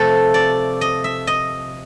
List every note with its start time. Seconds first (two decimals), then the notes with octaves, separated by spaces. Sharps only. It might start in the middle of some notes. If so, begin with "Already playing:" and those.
Already playing: C3 F3 A3 A4
0.34 D5
0.81 D#5
1.04 E5
1.27 D#5